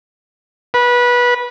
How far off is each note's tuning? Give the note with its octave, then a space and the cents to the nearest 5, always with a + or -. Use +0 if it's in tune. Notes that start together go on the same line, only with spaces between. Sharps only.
B4 -20